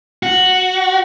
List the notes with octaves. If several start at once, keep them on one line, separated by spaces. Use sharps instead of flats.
F#4